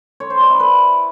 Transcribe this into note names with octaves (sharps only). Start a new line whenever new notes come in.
C#5
C5
D5
E4
B4